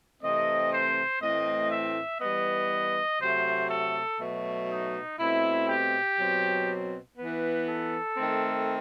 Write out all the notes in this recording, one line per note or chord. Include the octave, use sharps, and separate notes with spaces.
C3 E3 A3 C4 D#5
C5
A2 E3 A3 C4 D#5
E5
E3 G3 B3 D#5
C3 F#3 A3 C5
A4
B2 F#3 A3
D#4
B2 A3 C4 E4
G4
B2 F#3 C4
E3 B3
A4
D#3 A3 C4